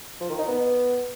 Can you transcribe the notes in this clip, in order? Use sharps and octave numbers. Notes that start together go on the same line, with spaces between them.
F3
D#3
D#4
B3